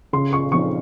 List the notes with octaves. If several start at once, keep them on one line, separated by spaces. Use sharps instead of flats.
C#3 C6
C#6
F3 C4 D#4 C#6